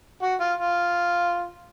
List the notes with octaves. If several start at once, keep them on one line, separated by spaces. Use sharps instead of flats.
F#4
F4
F4